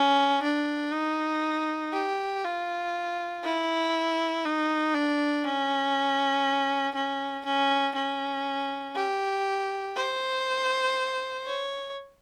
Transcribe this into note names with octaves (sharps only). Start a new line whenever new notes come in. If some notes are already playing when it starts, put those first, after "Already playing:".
Already playing: C#4
D4
D#4
G4
F4
E4
D#4
D4
C#4
C#4
C#4
C#4
G4
C5
C#5